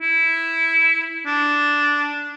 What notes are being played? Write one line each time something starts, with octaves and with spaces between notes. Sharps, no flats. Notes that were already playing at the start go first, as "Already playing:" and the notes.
E4
D4